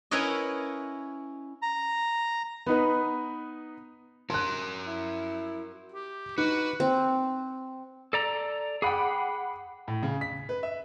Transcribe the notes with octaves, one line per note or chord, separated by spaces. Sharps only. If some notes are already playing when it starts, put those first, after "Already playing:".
C#4 E4 A#4 B4 C#5 D#5
A#5
B3 D#4 B4
F#4 A#4 C6 F#6
E4
G4
D#4 F#4 B4
C4
A4 D5 A#5
G#4 F#5 G5 B5 D6
A2
C#3
B6
B4
E5